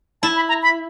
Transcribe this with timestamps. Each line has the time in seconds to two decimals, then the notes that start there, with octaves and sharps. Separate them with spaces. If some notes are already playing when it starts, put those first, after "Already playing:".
0.22 E4 A5
0.36 B5
0.48 A#5
0.62 B5